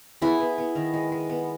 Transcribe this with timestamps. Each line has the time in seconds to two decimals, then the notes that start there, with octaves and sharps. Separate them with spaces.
0.22 B3 E4 G#4
0.40 B3
0.58 B3
0.75 D#3
0.94 G#3
1.12 G#3
1.29 B3